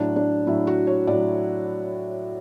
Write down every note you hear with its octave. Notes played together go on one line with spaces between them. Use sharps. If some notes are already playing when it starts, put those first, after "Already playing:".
Already playing: A2 F#3 D4
D4
A2 F#3 E4
F#4
C#5
A2 F#3 D5